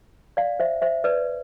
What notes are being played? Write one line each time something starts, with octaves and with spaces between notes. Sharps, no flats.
D5 F5
C5 E5
C5 E5
B4 D5